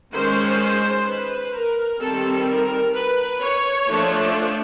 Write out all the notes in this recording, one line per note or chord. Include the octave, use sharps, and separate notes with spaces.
D#3 G#3 C#4 C5
C5
B4
A#4
D#3 G3 C4 A4
A#4
B4
C#5
F3 A3 D4